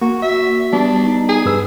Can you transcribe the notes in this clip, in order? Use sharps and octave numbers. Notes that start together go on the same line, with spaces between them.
A#3 F#4
F#4 E5
G3 B3 D4
D#4
G#4
G2 B4 E6